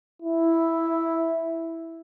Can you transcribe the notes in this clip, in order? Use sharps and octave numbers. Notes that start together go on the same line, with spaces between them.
E4